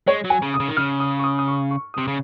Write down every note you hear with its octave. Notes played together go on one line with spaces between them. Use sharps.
G#3 C#5
F#3
G#5
C#3
D#6
C#3
D#3
C#3 F6
D#6
C#6
D#6
D#6
C#6
C#6
D#6
C3
C#3